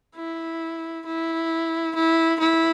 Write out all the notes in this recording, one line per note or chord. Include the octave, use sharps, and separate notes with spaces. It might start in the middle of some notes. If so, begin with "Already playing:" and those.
E4
E4
E4
E4